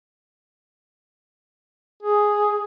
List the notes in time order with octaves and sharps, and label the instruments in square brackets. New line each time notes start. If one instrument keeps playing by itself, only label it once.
[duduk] G#4